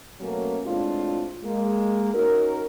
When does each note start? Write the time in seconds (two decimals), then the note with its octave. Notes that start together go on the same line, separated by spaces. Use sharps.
0.20 B2 F#3 A3 A#3 C#4
0.65 A2 G#3 C4 D4 F4
1.44 G#3 A#3
2.14 C#4 D#4 F#4 A#4